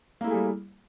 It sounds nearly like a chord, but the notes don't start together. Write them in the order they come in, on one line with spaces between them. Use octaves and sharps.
A#3 E4 A3 G#4 G3